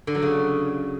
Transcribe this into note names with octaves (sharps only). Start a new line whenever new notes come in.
D3
F#3
C#3